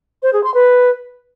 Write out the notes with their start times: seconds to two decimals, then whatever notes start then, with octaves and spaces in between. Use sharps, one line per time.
0.23 C5
0.33 G#4
0.44 C6
0.54 B4